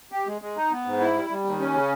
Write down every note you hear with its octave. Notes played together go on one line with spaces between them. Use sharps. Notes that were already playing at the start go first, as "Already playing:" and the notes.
G4
G#3
G#3
D#4
B3
G#2
E4
G3
G3
D#2
C#4
C#3